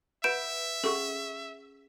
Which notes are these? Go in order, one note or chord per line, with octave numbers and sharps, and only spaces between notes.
B4 E5 F#5 B5 G6 D7 E7
C#4 G#4 A4 F#5 C#6